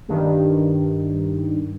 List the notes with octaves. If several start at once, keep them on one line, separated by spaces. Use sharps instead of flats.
G2 D#3